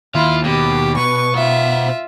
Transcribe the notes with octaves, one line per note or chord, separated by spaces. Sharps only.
D#2 E4 F4
B2 G4
B4 C#6
F4 C5 E5 F#5